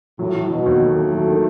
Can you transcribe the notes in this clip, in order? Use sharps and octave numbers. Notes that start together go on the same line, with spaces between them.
A2 F#3
F#3
B2 F#3
D#2
F#3 A3
D#3
F#3
D#3